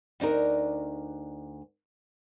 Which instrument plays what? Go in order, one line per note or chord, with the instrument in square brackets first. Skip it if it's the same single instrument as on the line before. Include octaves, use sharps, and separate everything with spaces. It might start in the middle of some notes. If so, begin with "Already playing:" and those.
[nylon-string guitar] D2 D4 D#4 A#4